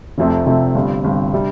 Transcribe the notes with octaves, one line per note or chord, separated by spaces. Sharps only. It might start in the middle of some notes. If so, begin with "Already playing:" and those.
F1 F2 C3 A3 C4
F1 F2 C3 A3 C4
G1 G2 G3 C4
G1 G2 G3 C4
C3 G3 D4